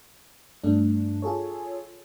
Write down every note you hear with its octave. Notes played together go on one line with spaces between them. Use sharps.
G2 A3 D4
F4 G#4 A4 C#5